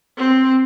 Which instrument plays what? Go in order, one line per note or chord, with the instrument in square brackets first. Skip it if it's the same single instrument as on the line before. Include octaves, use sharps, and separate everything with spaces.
[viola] C4